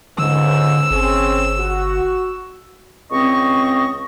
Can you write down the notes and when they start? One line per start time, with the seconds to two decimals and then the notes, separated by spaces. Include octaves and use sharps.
0.18 C#2 G#2 D3 E6
0.91 G1 C4 C#4 G#4
1.59 F#4
3.11 C#2 C4 D#5 C#6